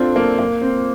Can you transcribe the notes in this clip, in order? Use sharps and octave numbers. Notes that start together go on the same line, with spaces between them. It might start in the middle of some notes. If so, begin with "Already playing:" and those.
Already playing: C4 D4 F4 A4
A#3
A#3
C4